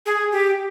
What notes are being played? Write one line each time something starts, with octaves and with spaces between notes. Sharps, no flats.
G#4
G4